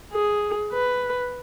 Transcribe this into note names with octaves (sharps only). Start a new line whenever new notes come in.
G#4
B4